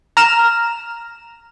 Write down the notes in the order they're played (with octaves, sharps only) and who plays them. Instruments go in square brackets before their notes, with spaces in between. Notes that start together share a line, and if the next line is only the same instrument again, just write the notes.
[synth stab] A#5 F6 E7